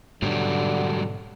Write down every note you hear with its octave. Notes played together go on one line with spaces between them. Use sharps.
G#2 B2 D3 F#3 G3 D4